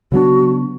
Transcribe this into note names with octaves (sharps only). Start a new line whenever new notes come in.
C#3 F#3 B3 D4 F#4